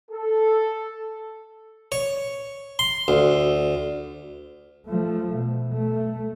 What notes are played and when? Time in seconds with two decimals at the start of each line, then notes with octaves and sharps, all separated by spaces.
0.11 A4
1.92 C#5
2.79 C6
3.08 D2
4.87 F3 A3
5.35 B2
5.73 A3